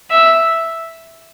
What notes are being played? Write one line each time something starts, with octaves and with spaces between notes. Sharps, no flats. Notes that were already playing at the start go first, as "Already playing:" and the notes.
E5